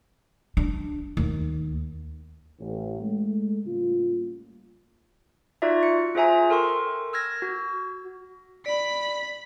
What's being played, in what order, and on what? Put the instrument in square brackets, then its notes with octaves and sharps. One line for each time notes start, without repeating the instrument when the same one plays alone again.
[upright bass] D4
D#2
[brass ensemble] A1
G#3 A3
A2 C#3 G3 A#3 F4
[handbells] D#4 F4 F#4 D5 E5
C#7
F4 G#4 C5 E5 G#5 A#5
A4 A#4 G5 C6 C#6
E6 F6 G#6 A#6
F#4
[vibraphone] D5 [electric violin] B5 B6